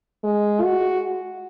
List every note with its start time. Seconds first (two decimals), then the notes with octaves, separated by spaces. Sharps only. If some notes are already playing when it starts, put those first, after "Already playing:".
0.24 G#3
0.63 F#4